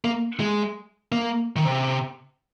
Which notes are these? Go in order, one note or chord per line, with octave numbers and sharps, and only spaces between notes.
A#3
G#3
A#3
D#3
C3